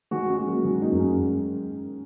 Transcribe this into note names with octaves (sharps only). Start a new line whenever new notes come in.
D#3 G#3 F#4
G#3 C#4
F#4
F#3 A#3
D#3 F#3 G#3
A#3 D#4
F#2
G#3 C#4